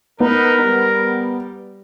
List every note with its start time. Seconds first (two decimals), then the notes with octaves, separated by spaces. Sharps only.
0.20 B3 D#4 A#4 B4
0.62 G3